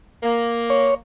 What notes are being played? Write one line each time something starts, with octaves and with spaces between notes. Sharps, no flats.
A#3
C#5